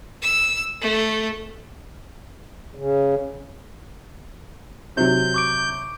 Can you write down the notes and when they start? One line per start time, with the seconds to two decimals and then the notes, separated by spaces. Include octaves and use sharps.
0.22 E6
0.82 A3
2.75 C#3
4.97 C3 F#3 G6
5.34 C#6 D6 D7